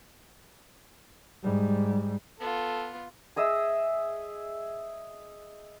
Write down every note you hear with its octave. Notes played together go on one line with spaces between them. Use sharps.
G#2 G3
B3 F4 A4
G#4 D#5 E5 E6